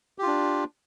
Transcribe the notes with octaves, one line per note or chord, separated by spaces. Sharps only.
D4 F4 G4